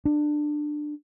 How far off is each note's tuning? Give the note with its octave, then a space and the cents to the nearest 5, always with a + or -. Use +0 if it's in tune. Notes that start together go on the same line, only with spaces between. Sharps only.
D4 +20